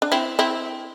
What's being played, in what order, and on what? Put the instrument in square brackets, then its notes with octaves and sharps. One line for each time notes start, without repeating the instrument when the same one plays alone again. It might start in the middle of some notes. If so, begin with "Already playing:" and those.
[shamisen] D4
C4 E4
C4 E4